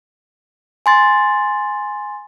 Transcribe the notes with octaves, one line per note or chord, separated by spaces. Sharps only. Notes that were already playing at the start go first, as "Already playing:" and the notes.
G#5 C6 A6